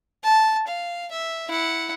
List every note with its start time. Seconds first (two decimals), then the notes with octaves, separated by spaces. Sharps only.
0.24 A5
0.68 F5
1.11 E5
1.48 E4 F#5